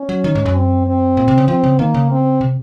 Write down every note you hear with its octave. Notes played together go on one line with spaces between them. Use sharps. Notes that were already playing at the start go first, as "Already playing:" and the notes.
Already playing: C#4
F#3
D#3
G#2
F#2
C4
C4
A#2
C3
C#3
F3 C4
C#3
D#3 A#3
C#3
C4
C3